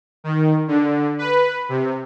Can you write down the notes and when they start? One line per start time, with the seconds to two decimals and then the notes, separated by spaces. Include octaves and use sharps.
0.24 D#3
0.68 D3
1.18 B4
1.69 C3